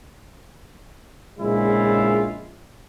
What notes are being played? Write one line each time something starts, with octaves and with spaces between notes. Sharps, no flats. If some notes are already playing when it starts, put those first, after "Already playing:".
A#1 C#3 G#3 E4 F4